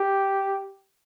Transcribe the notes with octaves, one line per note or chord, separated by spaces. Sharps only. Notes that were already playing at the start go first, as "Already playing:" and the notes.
Already playing: G4